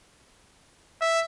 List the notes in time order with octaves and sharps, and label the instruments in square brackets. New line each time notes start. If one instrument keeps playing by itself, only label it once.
[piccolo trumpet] E5